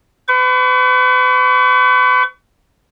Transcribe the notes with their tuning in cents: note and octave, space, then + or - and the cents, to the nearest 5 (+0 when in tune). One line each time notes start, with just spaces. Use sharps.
B4 +40 C#6 +35